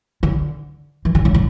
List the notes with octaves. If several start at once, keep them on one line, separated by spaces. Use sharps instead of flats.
D3
E3
D3
C#3
D3